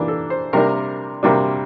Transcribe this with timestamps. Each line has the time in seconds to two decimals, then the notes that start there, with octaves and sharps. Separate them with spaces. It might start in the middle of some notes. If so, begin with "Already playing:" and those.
Already playing: E3 A#3 D4 G4
0.08 A4
0.30 C5
0.53 C3 G3 A#3 D4 A#4
1.23 C3 G3 A#3 D4